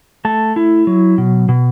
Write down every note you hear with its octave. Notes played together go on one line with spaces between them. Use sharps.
A3 A5
E4
F#3
B2
B2